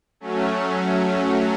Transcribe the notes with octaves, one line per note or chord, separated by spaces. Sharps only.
F#3 A3 C#4